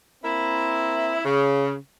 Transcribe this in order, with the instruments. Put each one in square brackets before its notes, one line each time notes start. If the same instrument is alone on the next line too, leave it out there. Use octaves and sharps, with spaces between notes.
[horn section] A#3 C4 E4
C#3